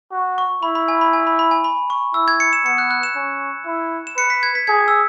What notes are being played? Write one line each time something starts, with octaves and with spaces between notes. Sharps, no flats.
F#4
C#6
E4 B5
B5
G#5
B5
G#5
B5
B5
G#5
B5
C#6
E4 E6
G#6
C#7
E7
B3 C#7
F#6
F#6
E7
C#4
E4
E7
B4 C#7
B6
G#6
B6
G#4 G#6
E6